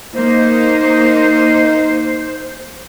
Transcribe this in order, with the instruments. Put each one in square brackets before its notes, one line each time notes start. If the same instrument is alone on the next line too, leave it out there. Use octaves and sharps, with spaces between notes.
[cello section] A#3 [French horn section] D#4 [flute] C5